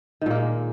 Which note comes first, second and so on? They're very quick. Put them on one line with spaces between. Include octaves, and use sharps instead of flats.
D#3 A#2 A#3 G#3